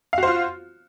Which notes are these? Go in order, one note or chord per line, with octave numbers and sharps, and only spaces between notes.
F4 F#4 C5 F5